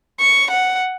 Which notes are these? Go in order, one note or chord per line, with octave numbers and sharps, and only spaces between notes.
C#6
F#5